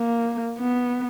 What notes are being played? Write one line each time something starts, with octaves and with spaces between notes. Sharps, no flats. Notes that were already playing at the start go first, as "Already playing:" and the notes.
Already playing: A#3
B3